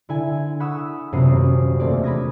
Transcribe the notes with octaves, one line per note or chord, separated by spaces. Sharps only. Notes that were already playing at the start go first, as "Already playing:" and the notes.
D3 E4 G#5
F#5 B5 C#6 D#6 E6
D#1 F#2 C3 B3 D#6 C7
E1 A3 A#3 C4 D5 D6
B5 D6 D#6 G#6 A#6